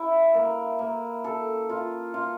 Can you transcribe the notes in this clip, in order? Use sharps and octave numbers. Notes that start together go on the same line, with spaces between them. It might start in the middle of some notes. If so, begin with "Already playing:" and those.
Already playing: E4
A#3
A#3
A4
F4
F4